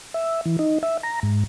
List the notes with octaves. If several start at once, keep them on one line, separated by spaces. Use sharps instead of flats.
E5
E3
D#4
E5
A#5
G#2